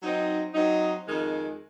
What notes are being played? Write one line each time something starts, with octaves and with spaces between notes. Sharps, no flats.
F#3 C4 D#4
F#3 C4 D#4
F2 D#3 G#3